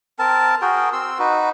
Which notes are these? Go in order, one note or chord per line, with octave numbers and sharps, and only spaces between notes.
C4 A#4 A5
F#4 G#4 A#4 G5
C4 C6 E6
D#4 F#4 B4